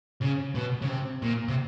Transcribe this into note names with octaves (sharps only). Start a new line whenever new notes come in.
C#3
B2
C#3
C3
A#2
C3